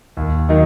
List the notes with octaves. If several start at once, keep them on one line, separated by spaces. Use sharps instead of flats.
D#2
D#3 F#3 D#4